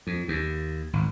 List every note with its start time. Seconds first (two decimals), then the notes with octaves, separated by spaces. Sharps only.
0.07 F2
0.28 D#2
0.93 G#1